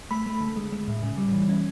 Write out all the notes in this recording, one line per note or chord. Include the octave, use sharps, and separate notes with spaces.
A3 B5
A3
D3
G#3
G#3
A2
C#3
G3
E3
C#4